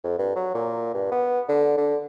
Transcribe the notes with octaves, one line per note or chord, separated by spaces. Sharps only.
F2
G2
F#3
A#2
G2
B3
D3
D3